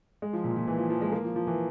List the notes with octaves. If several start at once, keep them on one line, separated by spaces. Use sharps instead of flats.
G#3
F3
A#2
A#2
E3
F3
F3
G#3
A#3
F3
F3
E3